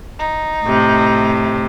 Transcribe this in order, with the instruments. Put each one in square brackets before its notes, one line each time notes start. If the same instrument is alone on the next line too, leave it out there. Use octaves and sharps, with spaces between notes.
[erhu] D#4
[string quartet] A2 C3